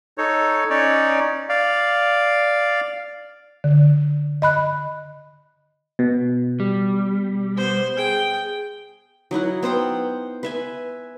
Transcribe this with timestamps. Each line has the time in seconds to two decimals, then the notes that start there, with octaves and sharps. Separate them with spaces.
0.18 D#4 A4 C#5
0.70 C#4 D#4 C#5 D5
1.49 D5 F5
3.64 D3
4.42 D#5 B5 F#6
5.99 B2
6.60 G3
7.56 B3 C5
7.95 G#4 G5
9.31 F#3 D#4 E4 F#5
9.63 B3 C5 F#5 G5
10.43 B4 E5 G#5